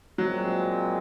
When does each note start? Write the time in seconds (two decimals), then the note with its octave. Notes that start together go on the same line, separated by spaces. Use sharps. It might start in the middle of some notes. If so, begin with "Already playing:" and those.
0.18 A#2 F#3 G#3 C4